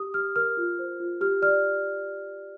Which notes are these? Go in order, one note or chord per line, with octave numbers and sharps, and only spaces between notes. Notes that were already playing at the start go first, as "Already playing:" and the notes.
Already playing: G4 D#6
G4 F6
A#4 F6
F4
C5
F4
G4 F6
D5 F6